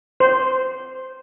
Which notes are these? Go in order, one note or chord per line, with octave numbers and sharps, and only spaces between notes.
C5